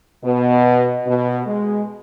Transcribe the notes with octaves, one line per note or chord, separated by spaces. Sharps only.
B2
B2
G#3